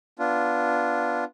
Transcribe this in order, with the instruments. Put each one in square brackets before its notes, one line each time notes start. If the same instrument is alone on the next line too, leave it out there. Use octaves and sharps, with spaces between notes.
[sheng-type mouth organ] B3 D4 F4